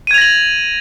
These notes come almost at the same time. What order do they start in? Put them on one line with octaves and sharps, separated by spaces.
D#7 G#6 F7 A#6 F#7